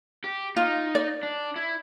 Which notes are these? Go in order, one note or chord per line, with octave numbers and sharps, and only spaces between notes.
G4
D#4 F4
D5
D4
E4